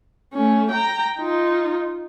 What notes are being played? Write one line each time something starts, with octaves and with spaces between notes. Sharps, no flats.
A3 C#4
G5 A#5
D#4 F4